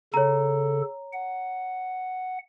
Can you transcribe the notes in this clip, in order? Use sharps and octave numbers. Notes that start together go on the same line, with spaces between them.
C#3 A4 C#5 A#5
F#5